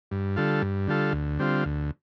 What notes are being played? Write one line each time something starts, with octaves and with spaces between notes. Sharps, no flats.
G2
D3 G3 F4 A4
G2
D3 G3 F4 A4
D2
D3 G3 C4 F4
D2